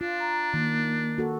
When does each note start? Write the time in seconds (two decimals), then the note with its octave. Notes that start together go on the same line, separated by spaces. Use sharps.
0.01 D4 F4
0.20 A#5
0.54 D#3 A#3
1.18 F#4 A4